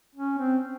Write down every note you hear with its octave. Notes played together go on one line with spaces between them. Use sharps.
C#4
C4